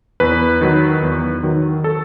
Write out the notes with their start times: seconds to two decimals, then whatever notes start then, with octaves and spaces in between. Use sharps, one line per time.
0.20 E2 B4
0.61 D#3 F#3
1.02 E2
1.43 D#3 F#3
1.84 A4